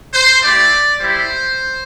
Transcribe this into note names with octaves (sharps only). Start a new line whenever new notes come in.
C5
A3 E4 G4 D5
G3 E4 G4 C5